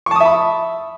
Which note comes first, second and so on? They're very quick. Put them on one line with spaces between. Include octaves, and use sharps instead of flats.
C#6 A5 D#6 E5 B5